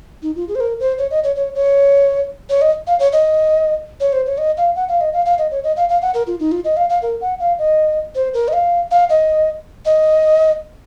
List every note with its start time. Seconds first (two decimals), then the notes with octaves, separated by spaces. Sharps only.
0.23 D#4
0.36 F4
0.48 G#4
0.55 C5
0.60 A#4
0.80 C5
0.98 C#5
1.11 D#5
1.24 C#5
1.36 C#5
1.54 C#5
2.50 C#5
2.62 D#5
2.87 F5
2.99 C#5
3.12 D#5
4.00 C#5
4.13 C5
4.26 C#5
4.38 D#5
4.57 F5
4.76 F#5
4.89 F5
5.01 D#5
5.13 F5
5.26 F5
5.38 D#5
5.51 C#5
5.64 D#5
5.77 F5
5.89 F5
6.02 F#5
6.14 A#4
6.27 F4
6.40 D#4
6.52 F4
6.65 D#5
6.77 F5
6.90 F5
7.02 A#4
7.21 F#5
7.40 F5
7.59 D#5
8.15 C5
8.34 A#4
8.48 D#5
8.53 F5
8.91 F5
9.10 D#5
9.85 D#5